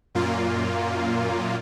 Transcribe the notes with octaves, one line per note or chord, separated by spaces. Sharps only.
F#2 A#2 A#3 F4